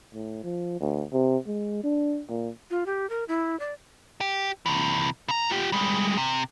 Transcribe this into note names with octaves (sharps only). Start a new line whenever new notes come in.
A2
F3
D2
C3
G#3
D4
A#2
F4
G4
A#4
E4
D5
G4
C3 E3
C#3 A#5
F4 G4
G3 G#3
C3